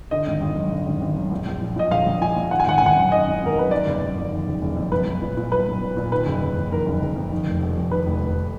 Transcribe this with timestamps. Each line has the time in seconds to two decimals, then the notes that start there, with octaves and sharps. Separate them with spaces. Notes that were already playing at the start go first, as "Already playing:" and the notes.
0.11 D3 D#5
0.26 G#1
0.41 G#1
0.56 F#2
0.71 D3
0.86 G#1
1.01 G#1
1.16 F#2
1.31 A#1
1.47 A#1
1.62 A#2
1.76 A#2 D#5
1.91 A#1 F5
2.06 A#1
2.21 A#2 G#5
2.36 A#2
2.51 D#3 F#5
2.60 G#5
2.66 G#1 F#5
2.78 G#1 G#5
2.86 F#5
2.96 F#2
3.11 D#3 D#5
3.27 G#1
3.42 G#1 A#4
3.57 F#2 B4
3.71 D#3 D5
3.86 F#1
4.01 F#1
4.17 F2
4.31 D#3
4.46 F#1
4.62 F#1
4.77 F2
4.92 B1 B4
5.06 B1
5.22 A#2
5.37 A#2
5.52 B1 B4
5.66 B1
5.82 A#2
5.97 A#2
6.12 D#3 B4
6.26 F#1
6.42 F#1
6.57 F2
6.72 D#3 A#4
6.86 F#1
7.02 F#1
7.16 F2
7.32 D#3
7.46 F1
7.62 F1
7.77 F2
7.91 D#3 B4
8.07 F1
8.22 F1